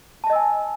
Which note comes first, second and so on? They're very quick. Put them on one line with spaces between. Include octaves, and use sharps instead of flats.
A5 E5 D#5 E6 G#5